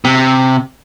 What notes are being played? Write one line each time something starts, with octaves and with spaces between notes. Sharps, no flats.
C3